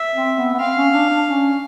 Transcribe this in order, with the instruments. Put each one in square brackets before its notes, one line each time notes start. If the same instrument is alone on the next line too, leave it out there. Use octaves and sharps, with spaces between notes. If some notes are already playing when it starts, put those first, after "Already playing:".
Already playing: [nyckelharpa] E5
[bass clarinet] C4
B3
B3
[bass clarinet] C4 [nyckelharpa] F5
[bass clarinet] C#4
D4
D4
C#4